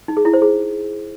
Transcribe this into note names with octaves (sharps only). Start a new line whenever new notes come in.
D#4
G#4
E4
C5
G#4